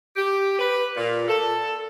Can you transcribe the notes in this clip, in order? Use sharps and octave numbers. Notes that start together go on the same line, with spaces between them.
G4
B4
A#2
A4